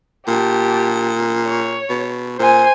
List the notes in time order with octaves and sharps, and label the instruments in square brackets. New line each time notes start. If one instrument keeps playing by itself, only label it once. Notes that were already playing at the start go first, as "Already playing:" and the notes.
[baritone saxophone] A#2 [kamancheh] G4 A5
[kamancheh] C#5
[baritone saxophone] B2
[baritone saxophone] A#2 [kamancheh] C5 G#5